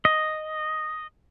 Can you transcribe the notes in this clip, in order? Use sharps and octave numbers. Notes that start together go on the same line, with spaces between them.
D#5